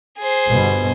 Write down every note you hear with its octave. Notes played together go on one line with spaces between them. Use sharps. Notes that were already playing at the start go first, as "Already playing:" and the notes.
G#4 C5
G1 B2 B3